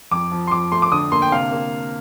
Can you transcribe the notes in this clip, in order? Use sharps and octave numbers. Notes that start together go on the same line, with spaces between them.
F2 D6
F3
C6
F2 D6
A3 C6
D6
D3 D#6
A#3 C6
G5
C3 F5
A#3